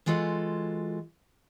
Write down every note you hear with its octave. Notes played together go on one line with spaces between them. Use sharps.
E3 G#3 F4 F#4 A4